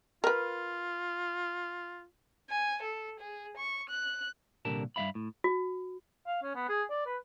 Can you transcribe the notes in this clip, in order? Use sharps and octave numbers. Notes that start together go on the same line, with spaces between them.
F4 A#4 B4
G#5
A4
G#4
C#6
F#6
C2 A#2 D3 G4 A#4 A5
G2 E3 E5 F5 B5
A2
F#4
F5
C#4
B3
G#4
D5
B4